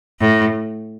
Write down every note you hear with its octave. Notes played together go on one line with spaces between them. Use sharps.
A2